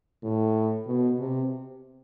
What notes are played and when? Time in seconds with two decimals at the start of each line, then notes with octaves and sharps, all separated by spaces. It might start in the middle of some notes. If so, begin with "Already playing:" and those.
0.23 A2
0.87 B2
1.20 C3